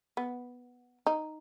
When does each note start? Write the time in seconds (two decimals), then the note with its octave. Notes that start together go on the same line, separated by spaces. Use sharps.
0.17 B3
1.07 D#4